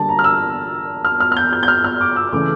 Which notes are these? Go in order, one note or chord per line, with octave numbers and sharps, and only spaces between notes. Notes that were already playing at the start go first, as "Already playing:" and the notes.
Already playing: D3 G3 A#3 A5
A#5
F6
E6
F6
F6
F6
G6
G6
G6
F6
F6
D6
E6
C#3 E3 A3 D6